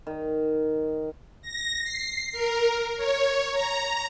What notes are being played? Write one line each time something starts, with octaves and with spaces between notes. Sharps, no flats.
D#3
A#6
C7
A#4
C#5
A#5